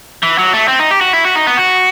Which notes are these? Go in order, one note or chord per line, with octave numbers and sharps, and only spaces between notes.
E3
F#3
A3
C4
D#4
G4
F#4
E4
F#4
D#4
B3
F#4